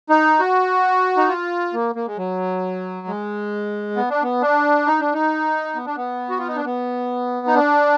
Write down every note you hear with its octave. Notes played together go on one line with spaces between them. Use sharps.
D#4
F#4
D#4
F4
A#3
A#3
G#3
F#3
G#3
B3
D4
B3
D4
D#4
D4
D#4
B3
D4
B3
F#4
F4
D#4
D4
B3
D#4
D4